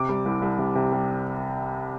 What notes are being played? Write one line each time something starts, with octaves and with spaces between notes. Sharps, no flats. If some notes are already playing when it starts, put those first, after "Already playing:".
Already playing: C3 D6
G3
C2
C2
C3
C3
G3